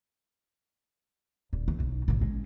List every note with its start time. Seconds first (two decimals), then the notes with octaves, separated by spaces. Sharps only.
1.53 D#1
1.68 E2
1.80 B1
2.08 A1 A#2
2.21 G#3 C#4